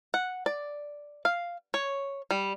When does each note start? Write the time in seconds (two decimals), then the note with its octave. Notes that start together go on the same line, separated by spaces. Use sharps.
0.14 F#5
0.46 D5
1.25 F5
1.74 C#5
2.31 G3